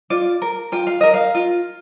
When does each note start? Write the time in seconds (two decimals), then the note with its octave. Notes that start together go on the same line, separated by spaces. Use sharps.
0.10 F4 D5
0.42 A#4
0.72 F4 G5
0.87 F5
1.01 A#4 D#5
1.14 F5
1.35 F4